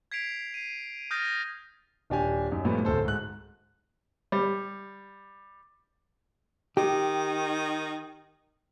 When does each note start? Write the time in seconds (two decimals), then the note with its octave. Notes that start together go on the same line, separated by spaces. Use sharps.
0.11 G#6 B6 C7 D7 F7
0.54 C7 D#7
1.11 D#6 F6 G6 A6 A#6
2.10 D#1 D4 G4 G#5
2.52 F#2 D#4
2.65 G2 A#2 F3 A3 B3
2.85 D1 A4 C5
3.05 G#2 F#6
4.32 G3
6.77 D#3 G4